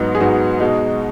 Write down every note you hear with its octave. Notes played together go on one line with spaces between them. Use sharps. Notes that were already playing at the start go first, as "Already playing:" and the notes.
Already playing: G#2 F#3 B3 D#4 F#4
G#4
G#2 F#3 B3 D#4 F#4
B2 G#3 D#4